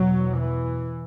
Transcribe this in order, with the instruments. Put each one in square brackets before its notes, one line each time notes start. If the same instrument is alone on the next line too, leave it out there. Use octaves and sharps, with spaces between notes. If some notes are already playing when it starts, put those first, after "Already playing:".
Already playing: [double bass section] E2 B2 F#3
E3